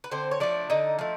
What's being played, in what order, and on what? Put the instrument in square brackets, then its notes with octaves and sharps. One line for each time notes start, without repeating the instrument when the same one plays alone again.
[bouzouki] B4
D3 C4 C5
C#5
F3 A3 D4 D5
D3 D#4 D#5
F3 A3